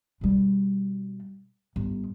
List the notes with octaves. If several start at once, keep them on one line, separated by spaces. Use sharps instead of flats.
B2 G3
G1